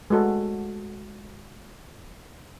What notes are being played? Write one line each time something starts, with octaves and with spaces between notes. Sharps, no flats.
G#3 A3 F#4 A4